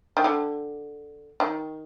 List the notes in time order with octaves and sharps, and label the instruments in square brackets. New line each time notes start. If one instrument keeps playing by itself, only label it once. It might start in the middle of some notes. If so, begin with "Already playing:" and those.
[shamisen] D#3
D3
D#3